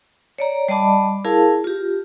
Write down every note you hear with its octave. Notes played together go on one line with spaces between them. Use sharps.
C#5 D5 A#5
G3 D5 D#5 A5 B5 D6
E4 G#4 A#4 F5 A5
F4 G4